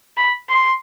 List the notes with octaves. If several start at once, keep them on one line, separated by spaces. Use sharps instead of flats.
B5
C6